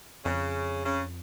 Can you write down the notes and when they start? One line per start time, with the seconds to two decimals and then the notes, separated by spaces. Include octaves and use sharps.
0.24 F2 C#3
0.86 C#3